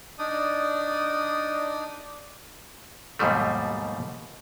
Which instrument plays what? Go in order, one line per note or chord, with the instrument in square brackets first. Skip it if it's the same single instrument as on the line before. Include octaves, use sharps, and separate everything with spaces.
[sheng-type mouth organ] D4 D#4 D5 D#6
[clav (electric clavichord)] D#2 G#2 B2 F3 G3 A3